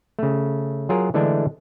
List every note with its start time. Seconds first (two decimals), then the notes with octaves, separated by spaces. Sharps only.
0.19 C#3 A3
0.89 F#3 F4 G#4 A#4
1.14 D3 E3 G#3 A3 D4